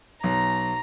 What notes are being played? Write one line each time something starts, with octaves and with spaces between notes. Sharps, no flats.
B1 A#5